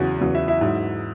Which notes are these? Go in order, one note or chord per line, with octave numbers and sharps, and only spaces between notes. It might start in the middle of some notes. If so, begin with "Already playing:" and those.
Already playing: E2 C#3 F#3 F#4
E2 C#3 F#3
E4 E5
E4 E5
G#2 F#3